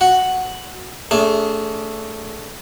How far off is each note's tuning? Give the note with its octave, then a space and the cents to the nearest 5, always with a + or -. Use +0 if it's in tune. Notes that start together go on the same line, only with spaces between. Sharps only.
F#4 +0 F#5 +0
A3 +0 D4 -40 G#4 +0